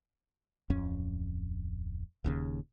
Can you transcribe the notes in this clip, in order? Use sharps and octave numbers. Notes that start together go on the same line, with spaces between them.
D1 F2 C#4
D#1 D#2 C#3